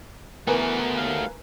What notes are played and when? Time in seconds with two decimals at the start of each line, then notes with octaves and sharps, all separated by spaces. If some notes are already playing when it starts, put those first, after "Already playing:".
0.47 E3 A3 B3 F#4 A#4 B4 G#5
0.97 D#2 F5